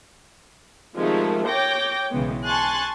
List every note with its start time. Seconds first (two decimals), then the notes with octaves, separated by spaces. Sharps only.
0.96 C3 D#3 F3 G#3 A3
1.48 C#5 G5 D6 G6 A#6
2.11 B1 C#3 E3 G#3 B3
2.45 G#5 A5 C6 C#6 F#6 A6